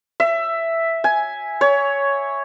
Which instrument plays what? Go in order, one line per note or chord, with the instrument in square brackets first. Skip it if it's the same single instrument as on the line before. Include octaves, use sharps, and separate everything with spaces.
[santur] E5
G#5
C#5